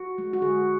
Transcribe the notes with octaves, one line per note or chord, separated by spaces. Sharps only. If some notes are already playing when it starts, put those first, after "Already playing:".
Already playing: F#4
G#3
F#4
D3 G#4